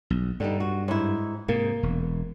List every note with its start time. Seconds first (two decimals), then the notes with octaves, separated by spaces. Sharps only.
0.10 B1
0.40 G2 D3 G3 D#4
0.60 F#4
0.88 G#2 E4
1.48 G#2 C3 A#3
1.83 E1